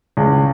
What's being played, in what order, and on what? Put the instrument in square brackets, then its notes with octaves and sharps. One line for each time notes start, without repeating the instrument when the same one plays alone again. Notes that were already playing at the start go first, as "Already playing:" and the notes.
[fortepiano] C#2